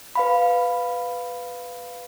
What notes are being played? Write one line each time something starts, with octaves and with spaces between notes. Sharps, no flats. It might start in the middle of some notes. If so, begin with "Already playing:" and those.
B4 F5 B5